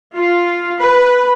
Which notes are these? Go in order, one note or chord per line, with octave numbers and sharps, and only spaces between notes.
F4
B4